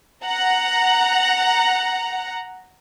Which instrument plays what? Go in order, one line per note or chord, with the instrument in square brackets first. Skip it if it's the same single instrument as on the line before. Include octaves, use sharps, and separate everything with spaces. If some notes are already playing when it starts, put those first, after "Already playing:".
[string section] F#5 A#5